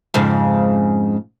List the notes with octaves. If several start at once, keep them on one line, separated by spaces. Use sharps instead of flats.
F2 G#2 C#3